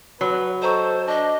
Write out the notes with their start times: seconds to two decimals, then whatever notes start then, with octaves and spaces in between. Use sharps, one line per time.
0.21 F#3 B4
0.62 A4 C5 D#5 A#5 C#6
1.08 D4 D#5 A5